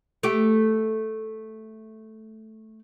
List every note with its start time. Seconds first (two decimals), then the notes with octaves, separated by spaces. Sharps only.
0.23 A3 G4